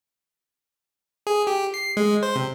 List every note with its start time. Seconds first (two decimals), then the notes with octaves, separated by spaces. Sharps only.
1.27 G#4
1.47 G4
1.74 C7
1.97 G#3
2.23 C5
2.36 C3